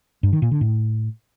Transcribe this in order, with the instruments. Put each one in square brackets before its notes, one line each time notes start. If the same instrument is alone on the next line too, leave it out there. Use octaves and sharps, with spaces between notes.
[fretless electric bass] G2
D#3
A#2
D3
A2